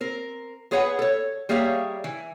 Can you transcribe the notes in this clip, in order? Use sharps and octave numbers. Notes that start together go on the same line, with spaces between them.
C4 A#4
B3 G#4 B4 C#5 F#5
A4 C#5
G3 A#3 G#4 C#5 E5 F5
E3